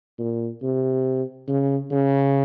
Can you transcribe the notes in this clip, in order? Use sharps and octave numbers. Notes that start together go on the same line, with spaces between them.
A#2
C3
C#3
C#3